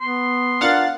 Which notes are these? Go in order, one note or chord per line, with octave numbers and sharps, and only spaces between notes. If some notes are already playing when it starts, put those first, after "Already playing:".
B3 C6
D4 F4 A#4 F5 F#5 A6